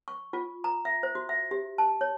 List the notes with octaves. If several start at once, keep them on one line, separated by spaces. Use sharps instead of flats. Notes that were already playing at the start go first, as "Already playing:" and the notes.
C#6
F4
A#5
E5
C5
F#4
E5
G4
A5
C#5